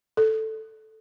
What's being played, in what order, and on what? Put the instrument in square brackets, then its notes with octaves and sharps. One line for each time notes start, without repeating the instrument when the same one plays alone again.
[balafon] A4